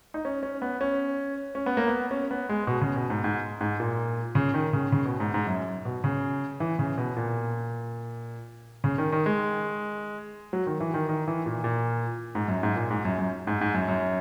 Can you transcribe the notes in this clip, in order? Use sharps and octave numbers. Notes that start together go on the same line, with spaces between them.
D#4
C#4
C#4
B3
C#4
C#4
B3
A#3
B3
C#4
B3
G#3
B2
C#3
B2
G#2
G#2
G#2
A#2
C#3
D#3
C#3
C#3
B2
G#2
G#2
F#2
B2
C#3
E3
C#3
B2
A#2
C#3
D#3
D#3
G#3
F#3
D#3
E3
D#3
D#3
E3
A#2
A#2
G#2
F#2
G#2
A#2
G#2
F#2
F#2
G#2
G#2
F#2
F#2